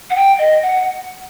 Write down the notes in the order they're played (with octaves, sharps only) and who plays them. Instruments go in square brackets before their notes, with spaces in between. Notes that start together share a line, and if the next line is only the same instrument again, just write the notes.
[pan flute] F#5
G5
D#5
F#5